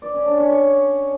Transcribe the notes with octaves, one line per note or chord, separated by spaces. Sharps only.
D5
C#4
D4
C#4
C#5